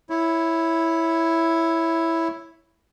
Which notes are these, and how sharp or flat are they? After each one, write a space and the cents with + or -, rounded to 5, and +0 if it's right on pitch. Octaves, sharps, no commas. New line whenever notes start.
E4 +0 C#5 +0